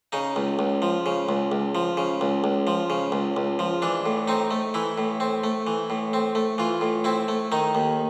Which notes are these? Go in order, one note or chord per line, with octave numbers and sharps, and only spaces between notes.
C#3 D#4
C#2
C#2
F3
C#3
C#2
C#2
F3
C#3
C#2
C#2
F3
C#3
C#2
C#2
F3
E3 D4
A2
C4 D#4
A3
E3 E4
A2
C4
A3
E3
A2
C4
A3
E3 F4
A2
C4 E4
A3
D#3 D#4
D#2